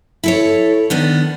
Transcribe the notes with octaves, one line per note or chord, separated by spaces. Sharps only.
E4 A4 C#5
D#3 B3 D4